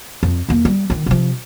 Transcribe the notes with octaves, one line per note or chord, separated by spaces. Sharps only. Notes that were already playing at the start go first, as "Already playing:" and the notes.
F2
E2 A#3
G3
D3 D#3
C3 F3